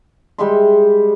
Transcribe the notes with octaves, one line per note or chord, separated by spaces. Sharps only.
G3 G#3 E5 C6